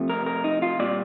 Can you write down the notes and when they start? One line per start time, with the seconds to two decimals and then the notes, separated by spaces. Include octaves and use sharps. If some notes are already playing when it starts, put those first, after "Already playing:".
Already playing: C3 F3 A3
0.10 A#4
0.26 A#4
0.44 D#4
0.62 F4
0.79 A#2 G3 D5